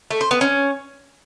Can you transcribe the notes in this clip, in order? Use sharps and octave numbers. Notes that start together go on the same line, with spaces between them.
A3
C5
B3
C#4